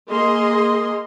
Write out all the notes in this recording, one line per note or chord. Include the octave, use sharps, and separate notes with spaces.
A#3 G#4 D#5 C6